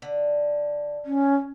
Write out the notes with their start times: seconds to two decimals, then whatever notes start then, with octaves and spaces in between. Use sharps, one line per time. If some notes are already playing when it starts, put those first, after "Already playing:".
0.02 D3
1.05 C#4